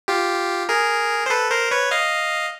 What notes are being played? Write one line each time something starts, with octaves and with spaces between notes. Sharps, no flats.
F4 G4
G#4 A#4
C5
A4 B4
A#4 C5
B4 C#5
D#5 F5